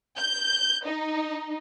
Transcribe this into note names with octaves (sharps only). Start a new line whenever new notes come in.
G6
D#4